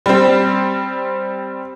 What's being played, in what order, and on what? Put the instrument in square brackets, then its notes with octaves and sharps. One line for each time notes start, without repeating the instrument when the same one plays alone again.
[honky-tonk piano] G3 C4